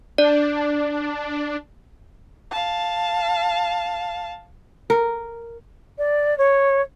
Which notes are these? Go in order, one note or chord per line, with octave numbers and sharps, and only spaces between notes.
D4 D5
F5 A5
A#4
D5
C#5